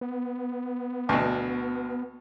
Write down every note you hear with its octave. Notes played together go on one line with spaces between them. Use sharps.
B3
D2 B2